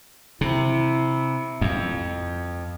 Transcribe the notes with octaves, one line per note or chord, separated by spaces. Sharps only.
C3 E4
F2